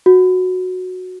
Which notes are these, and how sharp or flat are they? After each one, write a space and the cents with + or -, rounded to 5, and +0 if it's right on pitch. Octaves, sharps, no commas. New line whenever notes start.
F#4 -10